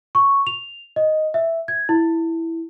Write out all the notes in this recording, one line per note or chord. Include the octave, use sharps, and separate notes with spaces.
C#6
F7
D#5
E5
G#6
E4